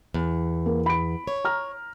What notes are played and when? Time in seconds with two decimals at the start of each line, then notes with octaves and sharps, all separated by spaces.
0.14 E2
0.66 A#3
0.86 B5 D7
1.27 C#5
1.45 A#5 F6